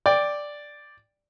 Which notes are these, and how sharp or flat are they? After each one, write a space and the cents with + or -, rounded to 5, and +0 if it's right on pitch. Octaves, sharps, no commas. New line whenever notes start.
D5 +0 G5 +15